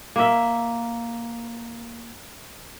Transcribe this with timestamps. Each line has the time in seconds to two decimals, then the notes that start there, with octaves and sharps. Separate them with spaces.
0.16 A#3 E5